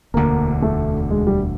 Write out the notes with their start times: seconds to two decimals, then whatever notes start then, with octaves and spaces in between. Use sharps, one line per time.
0.14 E1 D2 D3 A#3
0.62 A3
1.10 G#3
1.27 G3